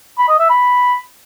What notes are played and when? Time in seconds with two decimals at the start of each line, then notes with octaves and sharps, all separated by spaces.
0.18 B5
0.29 D#5
0.39 E5
0.50 B5